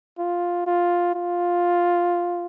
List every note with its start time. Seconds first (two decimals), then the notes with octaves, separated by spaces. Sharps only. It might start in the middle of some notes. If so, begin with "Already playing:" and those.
0.18 F4
0.66 F4
1.14 F4